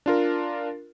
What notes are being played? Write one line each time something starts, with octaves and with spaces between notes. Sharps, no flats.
D4 F4 A#4